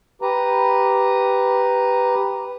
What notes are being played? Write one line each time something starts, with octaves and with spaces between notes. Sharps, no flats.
G4 B4 A#5